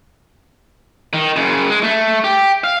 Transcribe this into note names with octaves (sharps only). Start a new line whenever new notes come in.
D#3
F#2 C#3
G#3
A3
G4
F5